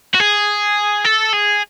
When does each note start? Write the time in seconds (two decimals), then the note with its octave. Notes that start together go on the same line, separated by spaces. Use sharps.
0.14 F#4
0.20 G#4
1.05 A4
1.34 G#4